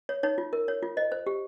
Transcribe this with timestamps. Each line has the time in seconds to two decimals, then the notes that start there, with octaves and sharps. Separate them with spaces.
0.09 C#5
0.23 D#4 C#5
0.38 F4
0.53 A#4
0.68 C#5
0.83 F4
0.97 C5 D#5
1.12 C5
1.26 G4